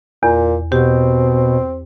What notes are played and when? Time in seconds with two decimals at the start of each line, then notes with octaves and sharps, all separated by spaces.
0.23 E2 A#2
0.72 B2 C4 G4